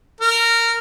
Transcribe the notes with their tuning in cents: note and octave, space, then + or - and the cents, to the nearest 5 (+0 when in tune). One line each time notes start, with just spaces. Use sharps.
A#4 -15